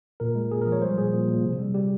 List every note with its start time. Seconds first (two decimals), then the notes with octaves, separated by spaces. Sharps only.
0.20 A#2 A#4
0.35 G#3
0.51 A#2 G#4
0.62 A#4
0.67 F3
0.72 C#5
0.82 G3 C5
0.97 A#2 G#4
1.13 A#2
1.28 A#2
1.44 C3
1.59 G3
1.74 G3 G4